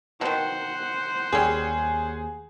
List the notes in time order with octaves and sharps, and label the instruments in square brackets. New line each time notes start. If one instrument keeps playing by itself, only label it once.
[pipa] B2 D#3 [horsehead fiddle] C5 F#5
[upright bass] D#2 [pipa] G3 C#4 [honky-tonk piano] G#4